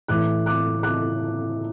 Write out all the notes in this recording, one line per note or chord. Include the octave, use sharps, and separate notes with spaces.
A2 E3 D6 F#6
D6 F#6
D6 F#6